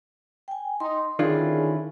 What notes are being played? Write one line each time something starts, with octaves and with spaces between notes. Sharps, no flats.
G5 G#5
D#4 C6
D3 D#3 C#4 D4 E4 F4 G#4